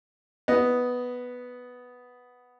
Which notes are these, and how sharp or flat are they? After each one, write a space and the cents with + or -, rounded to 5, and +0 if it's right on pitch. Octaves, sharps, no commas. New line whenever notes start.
B3 +0 D#5 +0